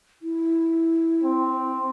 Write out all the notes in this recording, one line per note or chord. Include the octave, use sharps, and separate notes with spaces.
E4
C4